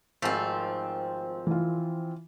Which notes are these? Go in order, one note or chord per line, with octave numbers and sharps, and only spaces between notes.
G#1 G#2 F3 A3 C4
E3 F4